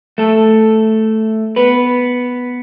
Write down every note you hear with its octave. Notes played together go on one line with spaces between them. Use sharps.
A3 A4
B3 B4